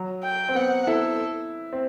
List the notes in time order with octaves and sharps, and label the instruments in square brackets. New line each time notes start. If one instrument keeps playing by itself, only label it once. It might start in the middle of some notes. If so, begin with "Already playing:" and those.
Already playing: [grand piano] F#3
[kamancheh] G5
[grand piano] C4
[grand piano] B3 [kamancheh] F#5
[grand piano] E4 [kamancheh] A4
[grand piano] C4